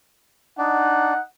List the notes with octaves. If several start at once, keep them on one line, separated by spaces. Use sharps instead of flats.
D4 D#4 F#5